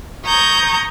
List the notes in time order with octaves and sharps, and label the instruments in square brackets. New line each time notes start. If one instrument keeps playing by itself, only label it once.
[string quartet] A#5 C#6 D#6 G6 G#6